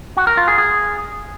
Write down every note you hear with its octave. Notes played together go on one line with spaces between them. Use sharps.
F#4
A#4
F4
G#4
G#4